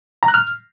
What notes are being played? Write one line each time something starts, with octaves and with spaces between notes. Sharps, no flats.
A#5
F#6
F6